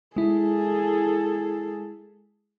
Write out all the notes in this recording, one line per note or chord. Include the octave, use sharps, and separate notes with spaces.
G#3 E4 G#4 A4